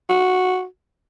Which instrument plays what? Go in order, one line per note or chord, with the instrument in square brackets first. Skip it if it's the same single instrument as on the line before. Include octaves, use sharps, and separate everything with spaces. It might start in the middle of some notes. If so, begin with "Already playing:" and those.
[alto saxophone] F#4